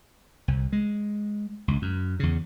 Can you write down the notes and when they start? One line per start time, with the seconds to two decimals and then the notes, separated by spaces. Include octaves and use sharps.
0.48 C2
0.72 G#3
1.68 C#2
1.82 F#2
2.20 E2 C#3